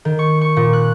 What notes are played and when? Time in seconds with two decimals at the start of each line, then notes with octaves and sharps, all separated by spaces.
0.05 D#3
0.19 C#6
0.41 C#6
0.57 A#2
0.73 F#6